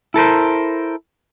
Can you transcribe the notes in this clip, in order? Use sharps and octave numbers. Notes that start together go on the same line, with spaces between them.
E4 A4 A#4 C5